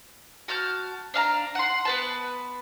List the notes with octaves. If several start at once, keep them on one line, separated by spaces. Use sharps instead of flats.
F#4 A5 F6 G6
D4 F5 A5 A#5
F#5 C6
B3 B4 A5